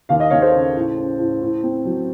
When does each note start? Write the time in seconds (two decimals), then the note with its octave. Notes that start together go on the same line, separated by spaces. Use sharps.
0.09 D#2 F5
0.20 D#5
0.30 D#2 C#5 F5
0.42 A4 C5
0.54 C#3
0.75 A2
0.97 C#4
1.19 A2
1.41 A2
1.63 C4
1.85 F#3